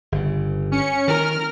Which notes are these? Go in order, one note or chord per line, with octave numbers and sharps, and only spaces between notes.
G1 C#3
C#4 C#7
D#3 A#4 F6